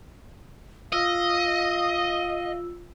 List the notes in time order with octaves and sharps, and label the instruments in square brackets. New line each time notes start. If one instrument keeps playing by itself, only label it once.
[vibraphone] F4 E6 [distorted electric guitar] D#5 [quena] F5